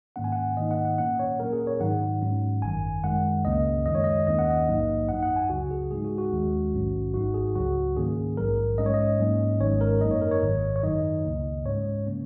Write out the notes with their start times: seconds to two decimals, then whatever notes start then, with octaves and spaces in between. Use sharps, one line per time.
0.16 G#2 D#3 A#3 C#4 F#5
0.24 G#5
0.32 F#5
0.57 G#2 D#3 A#3 D#4 D#5
0.71 F#5
0.85 F#5
0.98 A#2 A#3 C#4 F#5
1.19 C#5
1.40 A#2 F#3 A#3 C#4 A#4
1.53 G#4
1.67 C#5
1.80 G#2 D#3 F#3 D#4 F#5
2.22 G#2 F#3 C#4
2.62 G#1 F#2 D#3 G#5
3.04 F#2 D#3 G#3 F#5
3.45 C#2 C#3 A#3 C#4 D#5
3.86 F#2 D#3 G#3 D#5
3.95 C#5
4.04 D#5
4.27 D#2 D#3 A#3 C#4 D#5
4.39 F#5
4.51 D#5
4.68 A#1 G#2 F#3 A#3 D#4
5.09 F#2 F#3 D#4 F#5
5.23 F#5
5.36 G#5
5.50 C#2 C#3 F#3 F#4
5.71 G#4
5.91 G#2 G#3 D#4 G#4
6.05 F#4
6.18 F#4
6.32 D#2 D#3 G#3 C#4
6.73 A#1 G#2 D#3 F#3 C#4
7.14 G#1 G#2 F#3 D#4 F#4
7.34 G#4
7.55 C#2 C#3 F#3 F#4
7.96 G#2 D#3 A#3 C#4 G#4
8.37 A#1 G#2 F#3 A#4
8.78 G#2 G#3 C#4 D#5
8.86 C#5
8.94 D#5
9.19 G#2 F#3 A#3 C#4
9.60 G#1 G#2 D#3 G#3 C#4 C#5
9.81 A#4
10.01 F#2 F#3 A#3 D#4 D#5
10.11 C#5
10.21 A#4
10.31 C#5
10.43 G#1 G#2 D#3
10.76 C#5
10.83 F#2 D#3 F#3 D#4 D#5
11.25 C#2 C#3 A#3
11.65 G#2 G#3 C#4 C#5
12.06 C#3 A#3 C#4